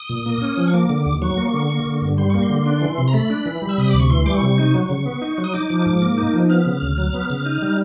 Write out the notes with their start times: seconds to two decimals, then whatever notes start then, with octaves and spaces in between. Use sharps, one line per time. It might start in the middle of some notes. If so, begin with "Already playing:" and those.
Already playing: D#6
0.09 A#2
0.26 A#3
0.41 C#4
0.57 F3
0.68 C#6
0.74 A#3 D6
0.89 D3
1.06 D#2
1.22 F#3 C#6
1.37 A#3
1.54 D3
1.70 A#3
1.86 D3
2.02 G2
2.18 G3 C6
2.30 A#3 C#6
2.42 C6
2.49 D3
2.66 D4
2.81 E3
2.98 C3
3.08 A#5
3.14 A3 B5
3.30 D4
3.46 E3
3.62 G3
3.69 E6
3.78 C3 D#6
3.89 D2 D6
4.00 C#6
4.10 E3 C6
4.26 G3 D6
4.34 C#6
4.42 C3
4.58 D#4
4.74 F#3
4.90 C#3
5.06 B3
5.21 D#4
5.38 F#3
5.44 D#6
5.54 D#4 D6
5.70 F3
5.86 G#2
6.02 A#3
6.18 D#4
6.34 F3
6.49 B3 F6
6.66 C#3
6.82 D2
6.98 F#3
7.14 B3
7.30 C#3
7.46 D#4
7.62 G3